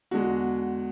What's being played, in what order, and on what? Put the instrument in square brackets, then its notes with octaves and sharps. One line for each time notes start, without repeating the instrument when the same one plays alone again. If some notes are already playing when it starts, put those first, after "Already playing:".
[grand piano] E2 D3 G#3 F#4